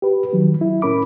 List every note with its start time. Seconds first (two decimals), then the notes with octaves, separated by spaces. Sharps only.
0.02 G4 B4
0.33 D#3 F#3
0.61 E4
0.82 A2 C#4 A#4 B5 D6